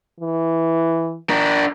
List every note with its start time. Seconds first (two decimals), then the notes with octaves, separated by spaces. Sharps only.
0.20 E3
1.30 D4 A#4